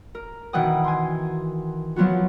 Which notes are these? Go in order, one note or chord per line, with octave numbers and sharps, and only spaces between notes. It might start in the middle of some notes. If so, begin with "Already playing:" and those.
A#4
B2 D#3 E3 F#5 G5 D#6
G#5 C6
F3 F#3 B3 F4 F#4